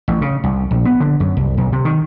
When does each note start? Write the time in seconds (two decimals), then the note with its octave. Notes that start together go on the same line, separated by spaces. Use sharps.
0.08 A1
0.21 C#3
0.44 C2
0.71 A#1
0.85 B3
1.00 D3
1.20 F#2
1.37 C2
1.58 B1
1.72 C3
1.85 D#3